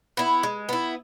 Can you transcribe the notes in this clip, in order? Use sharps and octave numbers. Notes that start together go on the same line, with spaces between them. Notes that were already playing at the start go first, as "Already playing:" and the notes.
B3 E4
G#3
B3 E4